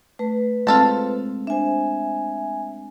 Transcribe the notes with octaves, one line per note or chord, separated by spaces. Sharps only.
A3 B4
G#3 C4 F4 A4 A5
D4 C5 E5 G#5